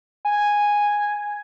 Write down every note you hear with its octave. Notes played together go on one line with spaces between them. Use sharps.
G#5